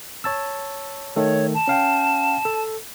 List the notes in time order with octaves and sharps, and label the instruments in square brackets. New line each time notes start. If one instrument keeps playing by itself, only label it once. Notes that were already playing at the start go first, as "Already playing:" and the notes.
[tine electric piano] C#5 A5 E6
[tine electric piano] D#3 A3 A4 [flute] C#5
[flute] A5
[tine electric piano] C#4 F5 G5
A4